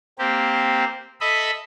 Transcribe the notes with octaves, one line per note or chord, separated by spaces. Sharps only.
A#3 C4 G4
A4 D#5 E5 B5